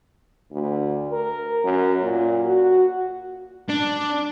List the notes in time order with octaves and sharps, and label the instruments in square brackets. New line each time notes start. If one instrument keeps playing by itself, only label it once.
[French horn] D2
A#4
F#2
A#2
F#4
[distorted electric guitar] D4